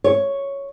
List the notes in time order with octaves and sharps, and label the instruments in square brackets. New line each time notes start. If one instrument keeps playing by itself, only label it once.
[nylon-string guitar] C#5